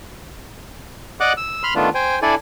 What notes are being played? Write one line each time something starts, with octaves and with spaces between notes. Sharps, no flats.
D5 D#5 F#5 D6 F#6
E6
B5 C6 F6
D#3 A3 B3 D4 F4
C5 G5 G#5
D4 E4 A4 D5 G#5